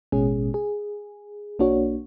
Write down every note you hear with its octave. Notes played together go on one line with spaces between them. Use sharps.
A1 B2 G#3 C#4 G#4
G#4
B1 A#3 D4 F#4 C#5